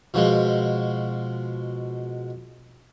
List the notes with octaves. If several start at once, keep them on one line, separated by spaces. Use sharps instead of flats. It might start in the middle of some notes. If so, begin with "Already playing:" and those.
B2 F3 G#3